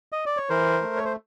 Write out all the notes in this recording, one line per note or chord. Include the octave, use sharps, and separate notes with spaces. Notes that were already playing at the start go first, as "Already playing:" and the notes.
D#5
D5
C#5
E3 A#4 C5
A3
C#5
C5